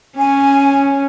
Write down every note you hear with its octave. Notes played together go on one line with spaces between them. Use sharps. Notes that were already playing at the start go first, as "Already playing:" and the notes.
C#4 G#5